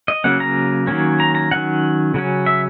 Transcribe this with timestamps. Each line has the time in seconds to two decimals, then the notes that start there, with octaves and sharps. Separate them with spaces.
0.08 D#5
0.24 C#3 F#3 A#3 C#4 F#5
0.40 A#5
0.87 D#3 F#3 A#3 C#4
1.20 A#5
1.35 A#5
1.51 D#3 F#3 C#4 F#5
2.14 C#3 F#3 C#4
2.46 E5